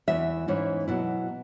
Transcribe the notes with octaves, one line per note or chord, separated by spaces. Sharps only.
E2 C#3 E3 E5
G#2 E3 C#4 E4
B2 F#3 E4